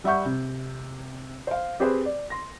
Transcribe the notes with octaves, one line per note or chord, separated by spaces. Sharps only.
G3 E5 F#5 C#6 G6
C3
C5 F5
C4 G4 G#4 B4 C5
D5
C6 A#6